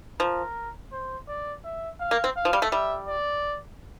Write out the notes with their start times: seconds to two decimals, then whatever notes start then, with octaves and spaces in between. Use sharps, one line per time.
0.20 F3 A#4
0.92 C5
1.28 D5
1.64 E5
2.00 F5
2.11 A#3
2.24 C4
2.36 F5
2.45 F3
2.53 G3
2.62 A3
2.71 G3 E5
3.08 D5